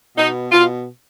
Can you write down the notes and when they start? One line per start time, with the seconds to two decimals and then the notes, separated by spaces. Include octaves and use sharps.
0.17 B2 D#4
0.52 B2 F4